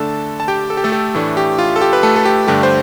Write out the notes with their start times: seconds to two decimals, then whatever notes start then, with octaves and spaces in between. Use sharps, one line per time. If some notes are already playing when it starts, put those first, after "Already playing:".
Already playing: D3 A3 D4 A4 A5
0.40 A5
0.48 G4 G5
0.70 A4
0.77 G4
0.84 A3 A4
0.92 G4
1.14 A2 E3 A3 D4
1.37 G4
1.59 F4
1.76 A4
1.81 G4
1.93 B4
2.03 A3 A4
2.16 A4
2.25 G4
2.48 G2 D3 A3 D4 G4
2.63 C5